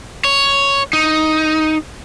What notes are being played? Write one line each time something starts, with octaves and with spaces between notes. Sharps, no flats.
C#5
D#4